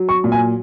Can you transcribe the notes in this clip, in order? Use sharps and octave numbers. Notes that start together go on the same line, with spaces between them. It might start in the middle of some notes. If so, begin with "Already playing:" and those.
Already playing: F#3
C#6
A#2
G#5